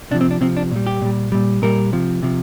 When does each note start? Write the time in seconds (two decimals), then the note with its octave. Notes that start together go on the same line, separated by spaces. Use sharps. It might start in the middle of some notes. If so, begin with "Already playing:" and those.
0.11 C3 D4
0.15 F3
0.21 C4
0.31 D4
0.41 C3 F3 C4
0.57 D4
0.71 A#2 G3
0.87 G4
1.02 A#2 G3
1.32 A#2 G3
1.62 A#2 G3 A#4
1.93 C3 F3
2.23 C3 F3